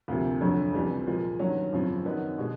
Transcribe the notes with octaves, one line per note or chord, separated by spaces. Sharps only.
D2 C3 F3 A#3
F1 F2 D3 F#3 A3
C#2 C3 E3 G3
A#2 F3 G#3
G2 D#3 F#3 A#3 C#4
G#1 F#2 C#3 F3
F#2 D#3 F#3 B3 D#4
B2 G#3